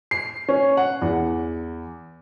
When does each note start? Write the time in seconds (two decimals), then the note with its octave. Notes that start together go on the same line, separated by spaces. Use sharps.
0.11 C7
0.49 C#4
0.77 F#5
1.02 E2